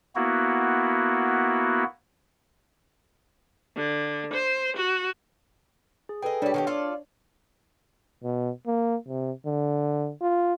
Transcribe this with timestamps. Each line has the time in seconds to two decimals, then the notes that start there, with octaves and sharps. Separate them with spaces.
0.16 A#3 B3 E4 F#4
3.76 D3
4.33 C5
4.77 F#4
6.09 G#4
6.23 G#4 A4 B4 D#5 G5
6.42 G3 D4 G4 C#5
6.54 D#3 F#4 G4
6.67 F4 A4 D5
8.24 B2
8.67 A#3
9.08 C3
9.46 D3
10.22 F4